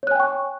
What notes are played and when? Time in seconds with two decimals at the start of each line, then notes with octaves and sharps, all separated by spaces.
0.03 C#5
0.07 F#6
0.11 G#5
0.16 G5
0.20 C#6